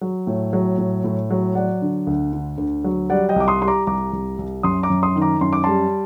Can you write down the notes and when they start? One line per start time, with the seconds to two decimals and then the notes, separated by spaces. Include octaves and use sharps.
0.01 F#3
0.27 A2
0.53 F#3
0.78 A2
1.04 A2
1.30 F#3
1.55 F#3 D5 F#5
1.82 D3
2.07 D2
2.33 D3
2.58 D2
2.84 F#3
3.10 G3 D5 F#5
3.29 D#5 G5
3.36 C2 D6
3.48 C6 D#6
3.61 G3 C6
3.68 A#5 D6
3.87 C2 A#5 D6
4.13 C2
4.39 C2
4.63 F#2 C6 D#6
4.83 A#5 D6
4.90 F#2
5.03 C6 D#6
5.16 D#3
5.22 A#5 D6
5.41 F#2 C6
5.53 D6
5.64 G3 A5 C6